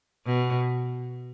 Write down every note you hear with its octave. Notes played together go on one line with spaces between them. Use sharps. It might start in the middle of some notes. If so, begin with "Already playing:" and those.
B2